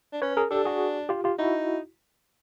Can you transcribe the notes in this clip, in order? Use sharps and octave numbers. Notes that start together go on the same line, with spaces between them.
D4
C#4 B4 C#5
G#4 A#4
D4 G4 A4
F#4 G#4
F4 G4
F4 G4
D#4 E4 F#4